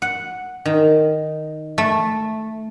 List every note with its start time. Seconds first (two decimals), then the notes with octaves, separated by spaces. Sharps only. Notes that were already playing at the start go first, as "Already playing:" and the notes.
0.02 F#5
0.66 D#3
1.78 A3